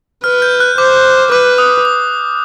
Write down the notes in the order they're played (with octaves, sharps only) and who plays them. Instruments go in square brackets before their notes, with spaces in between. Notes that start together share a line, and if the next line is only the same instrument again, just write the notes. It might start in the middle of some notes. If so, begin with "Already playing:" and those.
[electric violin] B4 [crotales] F6
[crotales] G6
F#6
[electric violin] C5 [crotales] D6
[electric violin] B4 [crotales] D6
[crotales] D#6
D#6